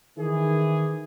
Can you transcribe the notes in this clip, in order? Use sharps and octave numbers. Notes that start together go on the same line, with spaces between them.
D#3 E3 G#4